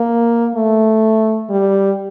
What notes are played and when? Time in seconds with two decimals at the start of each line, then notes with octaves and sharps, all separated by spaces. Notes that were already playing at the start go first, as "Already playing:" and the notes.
Already playing: A#3
0.55 A3
1.50 G3